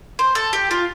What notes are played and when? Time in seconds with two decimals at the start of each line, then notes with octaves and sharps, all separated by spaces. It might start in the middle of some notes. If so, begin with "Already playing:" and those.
0.19 C5
0.35 A4
0.53 G4
0.71 F4